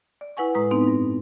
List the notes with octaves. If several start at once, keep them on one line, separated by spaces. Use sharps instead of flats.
D5
E4 B4 F#5 G#5 C#6
A2 G#3 B4 A#5 D#6
B3 C4 D#4
G2